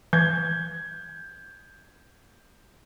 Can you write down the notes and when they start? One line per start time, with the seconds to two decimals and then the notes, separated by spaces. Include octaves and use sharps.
0.13 E3 G6 G#6